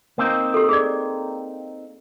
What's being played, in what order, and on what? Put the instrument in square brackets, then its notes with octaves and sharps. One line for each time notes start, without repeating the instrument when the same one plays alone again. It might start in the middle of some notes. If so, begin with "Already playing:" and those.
[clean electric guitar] A#3 C4 D#4
[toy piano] G4 A4
G#4 D5